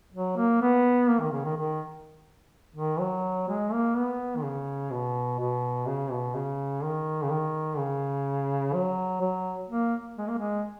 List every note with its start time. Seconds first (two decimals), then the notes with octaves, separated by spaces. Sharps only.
0.14 F#3
0.37 A#3
0.62 B3
1.09 A#3
1.21 D#3
1.32 C#3
1.45 D#3
1.56 D#3
2.76 D#3
3.00 F#3
3.48 G#3
3.72 A#3
3.96 B3
4.37 D#3
4.43 C#3
4.91 B2
5.40 B2
5.87 C#3
6.11 B2
6.35 C#3
6.83 D#3
7.23 C#3
7.30 D#3
7.78 C#3
8.73 F#3
9.21 F#3
9.70 A#3
10.18 G#3
10.28 A#3
10.38 G#3